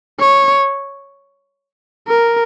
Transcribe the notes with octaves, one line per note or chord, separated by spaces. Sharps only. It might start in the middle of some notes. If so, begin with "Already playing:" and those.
C#5
A#4